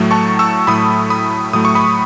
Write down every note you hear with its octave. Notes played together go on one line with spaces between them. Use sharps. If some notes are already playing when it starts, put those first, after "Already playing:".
Already playing: A2 F#3 A3
A5 C#6
C#6 E6
A2 F#3 A3 B5 D#6
B5 D#6
A2 F#3 A3 D#6
C#6
B5 D#6